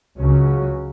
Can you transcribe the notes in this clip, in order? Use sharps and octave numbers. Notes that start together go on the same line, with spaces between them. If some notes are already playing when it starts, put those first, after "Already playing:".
C#2 C#3 F#3 C#4